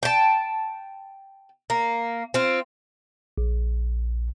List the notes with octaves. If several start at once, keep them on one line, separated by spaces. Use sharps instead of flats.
G5 A5
A#3
C4 F4
A#1